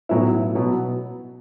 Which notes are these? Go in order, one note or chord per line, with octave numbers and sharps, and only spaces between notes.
B1 A2 F#3 B3 E4
B2 F#3 B3